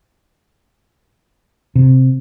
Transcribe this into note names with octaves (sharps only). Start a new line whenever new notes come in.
C3